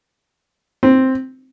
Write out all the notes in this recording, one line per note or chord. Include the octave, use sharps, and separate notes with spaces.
C4